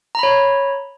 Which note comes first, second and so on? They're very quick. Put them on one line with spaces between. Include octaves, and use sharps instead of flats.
A#5 B5 C#5